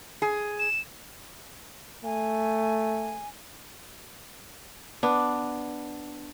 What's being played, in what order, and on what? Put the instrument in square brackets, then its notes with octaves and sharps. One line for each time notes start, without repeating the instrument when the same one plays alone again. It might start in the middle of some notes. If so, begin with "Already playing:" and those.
[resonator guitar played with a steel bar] G#4
[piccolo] E7
[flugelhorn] A3 [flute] G#5
[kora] B3 D4